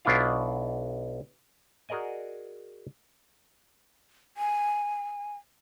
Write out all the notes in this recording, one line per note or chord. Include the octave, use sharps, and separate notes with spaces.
B1 B2 D4 E4 F4 F5
F#4 G#4 A#4 D5 D#5 G#5
G#5